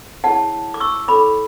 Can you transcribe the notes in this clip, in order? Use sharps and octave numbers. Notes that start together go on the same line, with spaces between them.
E4 G#4 C#5 F#5 A5
D6
C#6 E6
E4 A4 C#5 B5 D6